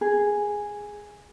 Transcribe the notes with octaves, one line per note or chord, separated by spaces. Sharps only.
G#4